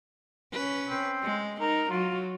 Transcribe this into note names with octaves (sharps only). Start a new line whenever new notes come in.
C#4 B4
C4
G#3
D#4 A#4
F#3 F4